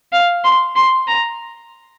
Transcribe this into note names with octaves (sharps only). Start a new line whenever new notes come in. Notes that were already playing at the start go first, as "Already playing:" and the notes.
F5
C6
C6
A#5